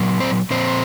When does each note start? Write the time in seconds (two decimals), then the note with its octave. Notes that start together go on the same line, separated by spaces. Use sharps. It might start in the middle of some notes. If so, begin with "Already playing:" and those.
Already playing: A#2 F#3
0.20 C4 C5
0.51 A#2 F3 C4 C5